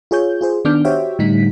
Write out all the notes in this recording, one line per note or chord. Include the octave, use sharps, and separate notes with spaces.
F4 G#4 C#5 G6
F4 G#4 C5
D#3 B3 D4 D6 F6 G6
F#4 G4 C5 C#5 E5 G5
A2 D3 G3 D#4 B6